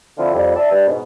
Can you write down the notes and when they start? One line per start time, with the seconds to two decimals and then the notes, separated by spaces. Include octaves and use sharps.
0.18 D3 F3 C4 E4 F4
0.33 F2 G3
0.55 D5 E5 A5
0.71 G2
0.88 G#2 B2